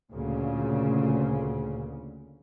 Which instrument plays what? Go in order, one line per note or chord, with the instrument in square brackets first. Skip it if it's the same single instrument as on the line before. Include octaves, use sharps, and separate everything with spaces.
[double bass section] D2 A#2 C#3